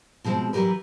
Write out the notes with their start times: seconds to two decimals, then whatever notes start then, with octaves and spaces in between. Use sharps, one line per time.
0.25 B2 F3 G#3 C4
0.53 E3 F#3 G3 G4 A#4 B4